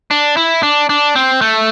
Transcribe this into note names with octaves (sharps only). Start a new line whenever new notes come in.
D4
E4
D4
D4
C4
A3